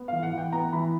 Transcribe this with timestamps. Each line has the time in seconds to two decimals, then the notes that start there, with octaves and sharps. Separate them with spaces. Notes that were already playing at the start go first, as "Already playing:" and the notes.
Already playing: B3
0.08 E3 F5
0.23 F#5
0.33 E3 G5
0.52 B3 A#5
0.73 E3 B5